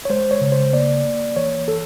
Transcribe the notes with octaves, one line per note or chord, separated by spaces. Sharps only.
C#5
G#3 C5
C#5
C#3
C5
A#3 D5
A#3
E3 C#5
A4